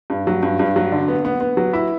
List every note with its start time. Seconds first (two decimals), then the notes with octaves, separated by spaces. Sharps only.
0.10 G2
0.27 F#3
0.43 G2
0.59 G2
0.76 F#3
0.92 D3
1.08 B3
1.25 B3
1.40 B3
1.57 F#3
1.73 E4